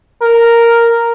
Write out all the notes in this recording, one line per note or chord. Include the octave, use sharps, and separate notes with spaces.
A#4